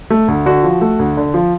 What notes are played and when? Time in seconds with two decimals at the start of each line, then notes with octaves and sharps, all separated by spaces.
0.10 A3
0.28 D2
0.46 D3 F#4
0.63 F3
0.81 A3
0.99 D2
1.17 D3
1.34 F3